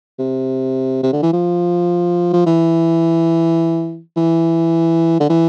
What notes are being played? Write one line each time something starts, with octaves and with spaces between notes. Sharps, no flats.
C3
C3
D3
E3
F3
F3
E3
E3
D3
E3